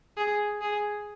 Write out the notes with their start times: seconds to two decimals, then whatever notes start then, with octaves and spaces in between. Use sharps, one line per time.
0.18 G#4
0.61 G#4